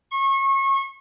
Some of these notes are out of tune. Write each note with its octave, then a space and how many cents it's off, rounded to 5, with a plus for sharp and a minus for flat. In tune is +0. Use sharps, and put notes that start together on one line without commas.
C#6 -30